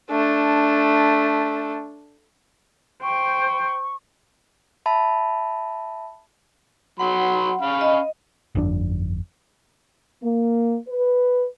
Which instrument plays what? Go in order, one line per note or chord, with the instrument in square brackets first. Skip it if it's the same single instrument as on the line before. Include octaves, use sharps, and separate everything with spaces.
[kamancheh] A3 D4
[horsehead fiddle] C5 G5 [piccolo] C#6
[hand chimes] E5 A5 B5
[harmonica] F#3 B5 C6 [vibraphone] F#5
[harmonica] C#4 F5 B5
[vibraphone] D#5
[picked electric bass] G1 F2 C4 D4
[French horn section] A#3
B4